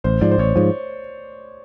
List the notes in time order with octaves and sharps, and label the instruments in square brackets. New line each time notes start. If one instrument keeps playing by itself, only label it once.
[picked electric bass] A1 [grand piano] C5
[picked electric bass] G#2 F3 [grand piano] D5
[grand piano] C5
[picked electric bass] A1 [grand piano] C#5
[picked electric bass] G#2 F3